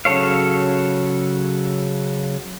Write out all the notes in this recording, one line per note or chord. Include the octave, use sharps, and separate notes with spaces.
C#3 F#3 A4 C#5 F5